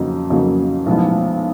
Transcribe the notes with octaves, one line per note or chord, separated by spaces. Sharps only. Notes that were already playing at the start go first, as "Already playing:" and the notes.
Already playing: F2 C#3 F#3 A#3 D#4
F2 C#3 F#3 A#3 D#4
B1 A2 F3 G#3 B3